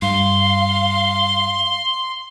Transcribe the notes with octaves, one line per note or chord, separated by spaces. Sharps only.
G2 F5 C6